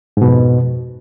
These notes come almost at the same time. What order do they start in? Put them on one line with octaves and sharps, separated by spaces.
G#2 B2 F2